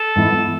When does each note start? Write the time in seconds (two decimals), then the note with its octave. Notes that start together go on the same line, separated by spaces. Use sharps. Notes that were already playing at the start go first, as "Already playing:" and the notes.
Already playing: A4
0.16 G#2 E3 B3 E4